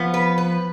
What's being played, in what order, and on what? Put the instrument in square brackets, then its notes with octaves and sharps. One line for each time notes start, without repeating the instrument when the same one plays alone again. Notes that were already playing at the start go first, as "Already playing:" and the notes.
Already playing: [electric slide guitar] F3 [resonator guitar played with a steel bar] B3
[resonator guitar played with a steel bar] B4
B4